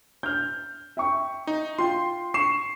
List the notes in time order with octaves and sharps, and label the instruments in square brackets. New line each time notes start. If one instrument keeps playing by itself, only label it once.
[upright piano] F6 G6
E5 G5 C#6
[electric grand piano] D#4
[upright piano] F4 G5 [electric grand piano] C6
[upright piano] C#6 [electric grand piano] C7 E7